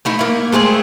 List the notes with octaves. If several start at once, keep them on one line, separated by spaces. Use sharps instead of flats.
A3 D#4 E4
A#3 E4
G#3 A3 C4 G#4